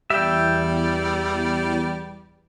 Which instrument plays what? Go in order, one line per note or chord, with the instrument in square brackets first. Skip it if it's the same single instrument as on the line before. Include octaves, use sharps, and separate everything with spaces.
[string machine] E2 [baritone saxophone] G3 [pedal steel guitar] E5 G5